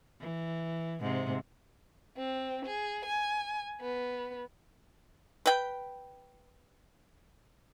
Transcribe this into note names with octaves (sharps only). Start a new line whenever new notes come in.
E3
G#2 C3
C4
G#4
G#5
B3
B4 G5